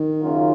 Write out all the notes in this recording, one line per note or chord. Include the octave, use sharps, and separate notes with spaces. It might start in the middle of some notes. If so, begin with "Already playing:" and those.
Already playing: D#3
F#2 C#3 F#3 A#3 F4